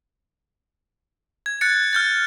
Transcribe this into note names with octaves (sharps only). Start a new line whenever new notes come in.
G#6
F#6 A6 C#7
F6 G6 A6